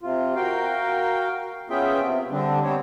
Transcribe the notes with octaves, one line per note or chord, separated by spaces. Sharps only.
C3 F4
F#4 A#4 F5 G5
B3 C#4 F4 G#4 E5 G5
C3
D3 G3 C4 D4
B3 C4 C5 C#5